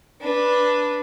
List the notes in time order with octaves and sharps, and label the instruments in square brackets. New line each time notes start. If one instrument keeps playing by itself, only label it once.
[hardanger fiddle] D4 B4